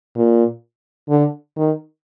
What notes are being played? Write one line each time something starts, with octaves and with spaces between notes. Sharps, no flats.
A#2
D3
D#3